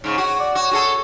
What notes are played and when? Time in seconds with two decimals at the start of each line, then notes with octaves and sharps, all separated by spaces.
0.04 G#2 C#3 C#5
0.18 F#4
0.40 D5
0.55 F#4 C#5
0.71 F#4 G#4 A4